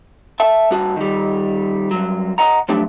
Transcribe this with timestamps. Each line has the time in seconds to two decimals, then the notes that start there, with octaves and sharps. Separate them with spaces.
0.40 E5 A5
0.71 G2 F#4 A5
0.96 D#3 G3
1.91 G2 F#3
2.38 D#5 F#5 A#5
2.69 F3 F#3 A3 D4 G4